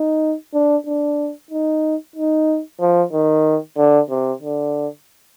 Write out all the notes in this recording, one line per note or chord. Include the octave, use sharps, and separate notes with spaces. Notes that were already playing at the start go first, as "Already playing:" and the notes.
Already playing: D#4
D4
D4
D#4
D#4
F3
D#3
D3
C3
D3